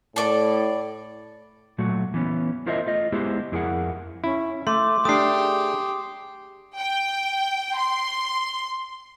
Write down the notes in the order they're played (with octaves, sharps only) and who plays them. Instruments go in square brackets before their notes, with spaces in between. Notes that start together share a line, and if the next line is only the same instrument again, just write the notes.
[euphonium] A2 [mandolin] A4 D5
[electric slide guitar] A#2 F#3 A3 F#4
E3 B3 C#4
E4 F4 A#4 C5 D#5 E5
A3 F4 D#5
G#3 B3 E4 G4 G#4 C5
F2 E4 G#4 A#4 F#5
[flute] C#4 [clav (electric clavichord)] E4
[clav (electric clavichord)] A3 [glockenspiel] C6 [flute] D6
[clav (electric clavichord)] A3 D4 [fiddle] G4 [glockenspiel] D#6 C7
[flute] G#4
[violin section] G5
C6